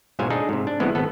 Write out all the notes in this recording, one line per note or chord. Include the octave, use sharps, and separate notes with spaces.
B1 G#2 F#3 C5 F5 G#5
D4 D#4 G#4 A4
G#2 C3
D4
C2 C3 E3 G#3 B3
G#1 B3 A4